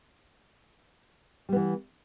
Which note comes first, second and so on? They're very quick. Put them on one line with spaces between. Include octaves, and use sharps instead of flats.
G3 B3 E3